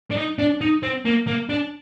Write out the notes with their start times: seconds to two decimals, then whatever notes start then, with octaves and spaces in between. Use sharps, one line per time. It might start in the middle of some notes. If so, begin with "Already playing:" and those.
0.11 D4
0.17 D#4
0.39 D4
0.61 D#4
0.83 C4
1.06 A#3
1.27 A#3
1.49 D4